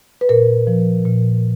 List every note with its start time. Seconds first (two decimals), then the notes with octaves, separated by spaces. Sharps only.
0.21 B4
0.29 A#2 A#4
0.67 F3
1.05 A#2